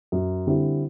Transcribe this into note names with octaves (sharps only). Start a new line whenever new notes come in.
F#2
D3 G3 C4 E4